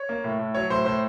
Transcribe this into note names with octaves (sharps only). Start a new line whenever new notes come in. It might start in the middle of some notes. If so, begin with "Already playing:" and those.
Already playing: C#5
A#3
A2
A2
F#3 C#5
A2 C5
A2 C5